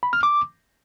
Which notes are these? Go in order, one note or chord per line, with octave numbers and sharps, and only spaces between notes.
B5
F6
D6